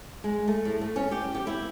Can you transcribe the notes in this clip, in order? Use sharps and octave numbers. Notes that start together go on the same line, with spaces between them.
G#3
A3
A2
A3
C#4
G4
G4
E4